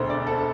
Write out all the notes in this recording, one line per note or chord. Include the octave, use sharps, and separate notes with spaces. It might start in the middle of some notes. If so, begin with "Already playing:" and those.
Already playing: E1 D2 D3 C5 E5
D5
A4